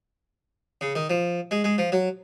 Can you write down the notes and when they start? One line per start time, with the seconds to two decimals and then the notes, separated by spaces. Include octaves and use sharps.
0.81 C#3
0.95 D#3
1.10 F3
1.51 G#3
1.64 G#3
1.78 F3
1.92 F#3